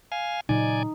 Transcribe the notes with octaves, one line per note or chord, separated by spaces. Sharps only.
F5 G#5
A#2 C#3 F#3 D#4 D5 G#5